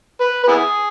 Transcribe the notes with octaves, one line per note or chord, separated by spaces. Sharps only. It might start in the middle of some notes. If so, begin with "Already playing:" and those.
B4
B4
B3 E4 G#4